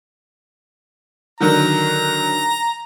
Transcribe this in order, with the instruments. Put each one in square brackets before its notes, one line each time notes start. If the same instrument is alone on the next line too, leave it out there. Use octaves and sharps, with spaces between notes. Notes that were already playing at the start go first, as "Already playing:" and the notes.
[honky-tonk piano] D3 D#3 F#3 [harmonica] A#5